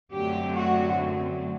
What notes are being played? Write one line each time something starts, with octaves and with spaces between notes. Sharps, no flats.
F#2 D3 F#3 A3 C4 G4
F#4